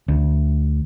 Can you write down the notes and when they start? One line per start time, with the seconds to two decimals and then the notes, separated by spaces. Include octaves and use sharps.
0.08 D2